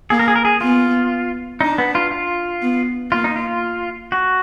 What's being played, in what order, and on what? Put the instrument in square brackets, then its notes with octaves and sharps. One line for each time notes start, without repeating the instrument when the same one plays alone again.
[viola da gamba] A#3 [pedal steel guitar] G#4
[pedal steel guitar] A#4
G#4
A#4
G#4
[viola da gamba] B3 [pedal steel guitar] F4
[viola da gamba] D4 [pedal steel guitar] D#4
[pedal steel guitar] B3
F4
F4
[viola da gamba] B3
[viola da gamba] A#3 [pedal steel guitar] F4
[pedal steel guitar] D#4
F4
F#4